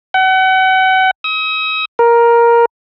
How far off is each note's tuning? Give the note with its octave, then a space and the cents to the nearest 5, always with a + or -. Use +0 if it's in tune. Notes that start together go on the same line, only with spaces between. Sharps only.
F#5 +35
D#6 +40
A#4 +10